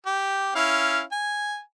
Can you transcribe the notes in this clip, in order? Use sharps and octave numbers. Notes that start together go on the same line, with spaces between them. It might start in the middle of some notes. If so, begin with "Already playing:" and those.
G4
C#4 E4 F5
G#5